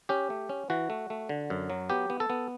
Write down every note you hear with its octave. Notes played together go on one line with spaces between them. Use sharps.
C#4 G4
A3
C#4
E3 F#4
A3
A3
D3
F#2
F#3
B3 G4
B3
A4
B3